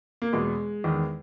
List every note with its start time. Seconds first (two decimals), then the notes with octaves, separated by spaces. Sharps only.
0.22 A#3
0.33 E2 B2 G#3
0.84 E2 D#3